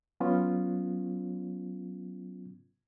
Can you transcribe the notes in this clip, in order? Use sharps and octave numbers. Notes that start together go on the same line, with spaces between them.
F#3 B3 C#4 F4